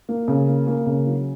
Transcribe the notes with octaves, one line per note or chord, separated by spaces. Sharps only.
A#3
C#3
A#3
A#3
C#3
F#3